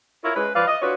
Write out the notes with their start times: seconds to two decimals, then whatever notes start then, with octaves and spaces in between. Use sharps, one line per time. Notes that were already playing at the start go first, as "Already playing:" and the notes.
0.23 E4 F4 A#4 C#5
0.36 G#3 C#4 B4
0.54 F3 B4 D5 F5
0.67 D#5
0.81 D4 F4 F#4 B4 C#5